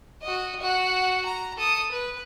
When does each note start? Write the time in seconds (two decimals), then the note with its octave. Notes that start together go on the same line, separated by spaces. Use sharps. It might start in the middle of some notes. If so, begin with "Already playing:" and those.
0.22 F#4 D#5
0.60 F#4 F#5
1.25 A#5
1.57 A4 D#6
1.91 B4